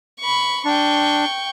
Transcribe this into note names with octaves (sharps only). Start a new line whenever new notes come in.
B5 C#6
D4 G5 C#6